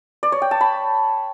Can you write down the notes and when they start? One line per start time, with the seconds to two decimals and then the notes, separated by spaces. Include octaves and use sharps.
0.23 D5
0.32 C#5
0.42 G5
0.51 A5
0.61 B5